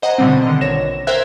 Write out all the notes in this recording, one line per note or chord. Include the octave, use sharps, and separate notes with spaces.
C5 D#5 F#5 G#5 A#5
B2 D3 G3 C4
D3 D#3 D#5
A#1 C#5 A#6 E7
A#4 C5 E5 G5 F#6 G#6